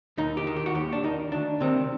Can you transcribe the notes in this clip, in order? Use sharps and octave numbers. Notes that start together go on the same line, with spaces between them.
D#2 D#4
G4
D#3
G4
F#4
D#2 G4
D4
D#3 D#4
D2 D4
C3 D#3 C4